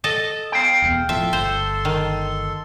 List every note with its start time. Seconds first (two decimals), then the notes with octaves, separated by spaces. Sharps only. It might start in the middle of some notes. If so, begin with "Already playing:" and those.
0.04 A4 D#5
0.52 F5 G5
0.82 E1 E2 B3
1.09 A2 F3 A4 E5 C6
1.33 G1 C5
1.85 D#3